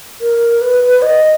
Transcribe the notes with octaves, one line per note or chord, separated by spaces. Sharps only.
A#4
B4
D#5